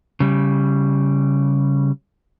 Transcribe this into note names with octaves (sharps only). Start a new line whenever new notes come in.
C#3 G3